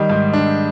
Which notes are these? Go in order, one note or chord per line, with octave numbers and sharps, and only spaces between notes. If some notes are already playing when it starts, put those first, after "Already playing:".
Already playing: D#3 G3 D#5
G#2
D4